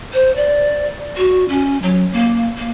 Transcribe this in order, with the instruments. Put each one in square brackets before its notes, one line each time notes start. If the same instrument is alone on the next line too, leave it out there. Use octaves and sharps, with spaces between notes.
[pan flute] C5
D5
F#4
C#4
F#3
A#3
A#3